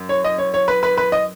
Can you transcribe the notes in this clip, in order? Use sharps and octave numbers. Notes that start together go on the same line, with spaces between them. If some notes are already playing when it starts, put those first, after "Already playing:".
Already playing: F#2
C#5
D#5
C#5
C#5
B4
B4
B4
D#5